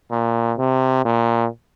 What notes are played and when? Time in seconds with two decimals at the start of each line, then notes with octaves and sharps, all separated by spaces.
0.11 A#2
0.58 C3
1.05 A#2